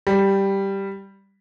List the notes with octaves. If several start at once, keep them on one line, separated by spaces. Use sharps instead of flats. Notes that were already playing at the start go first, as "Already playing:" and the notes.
G3